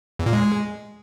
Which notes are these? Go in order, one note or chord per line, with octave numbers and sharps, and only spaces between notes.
E2
A#2
G#3